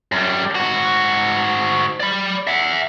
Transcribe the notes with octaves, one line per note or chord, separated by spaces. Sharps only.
F#2 G3
G#2 F#4
D5 B5
E5 F#5